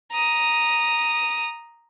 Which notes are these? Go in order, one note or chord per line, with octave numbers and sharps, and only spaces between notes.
A#5 D#6